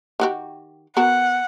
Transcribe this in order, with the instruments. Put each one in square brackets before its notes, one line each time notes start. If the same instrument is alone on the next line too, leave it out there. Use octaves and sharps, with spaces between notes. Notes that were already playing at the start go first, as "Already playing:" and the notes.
[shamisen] D#3 F#4 G4
[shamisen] B3 F#4 A#4 [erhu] F#5